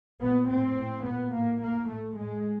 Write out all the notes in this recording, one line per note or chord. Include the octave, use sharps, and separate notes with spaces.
A#2 B3
A2 C4
A2
A#2 B3
A2 A#3
A2 A#3
A2 A3
A2 G#3